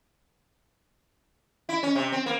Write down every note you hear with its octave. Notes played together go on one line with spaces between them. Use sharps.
E4
C#4
C3
C4
A#3